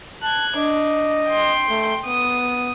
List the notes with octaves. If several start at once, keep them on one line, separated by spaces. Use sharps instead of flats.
A5 F#6 G#6
D4 D#5
G5 C6
A3
B3 D#6